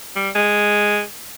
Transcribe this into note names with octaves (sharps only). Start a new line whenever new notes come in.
G3
G#3